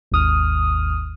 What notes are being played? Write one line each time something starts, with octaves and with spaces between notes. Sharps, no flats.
G#1 D#2 D#6 F6